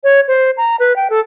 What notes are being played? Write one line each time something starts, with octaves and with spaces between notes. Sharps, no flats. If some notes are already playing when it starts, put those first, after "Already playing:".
C#5
C5
A#5
B4
G5
A4